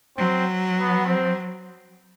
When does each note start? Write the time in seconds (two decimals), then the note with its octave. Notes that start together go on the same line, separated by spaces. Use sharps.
0.17 F#3 C4
0.76 B3
1.05 C4